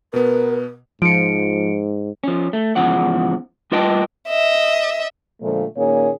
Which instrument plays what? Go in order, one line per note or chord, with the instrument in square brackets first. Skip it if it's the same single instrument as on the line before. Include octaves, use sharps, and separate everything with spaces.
[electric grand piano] B2 B3 [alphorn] A#4 [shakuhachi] B4
[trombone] G#2 [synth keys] F3 [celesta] C#7 D7
[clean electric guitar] F3 C#4
A3
E2 G#2 C#3 F3 F#5
G3 F4 B4 D#5 G5 A5
[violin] D#5 E5
[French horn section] A#2 D3 F3 G#3 A3
A#2 D#3 A#3 C#4 G#4 C#5